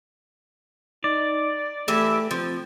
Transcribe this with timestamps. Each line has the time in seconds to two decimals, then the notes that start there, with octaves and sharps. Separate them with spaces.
1.04 D#4 D5
1.88 E3 A3 G4 E5
2.31 F3 C4